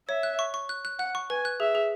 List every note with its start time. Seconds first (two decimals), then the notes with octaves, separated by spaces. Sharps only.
0.08 C#5 E5
0.23 F#6
0.39 C#6
0.54 C#6
0.69 F#6
0.85 F#6
0.99 F#5 F#6
1.15 C#6
1.30 B4 G#5
1.45 F#6
1.60 G#4 E5
1.75 G#4